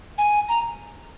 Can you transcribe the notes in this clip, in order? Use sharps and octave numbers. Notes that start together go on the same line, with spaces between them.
G#5
A#5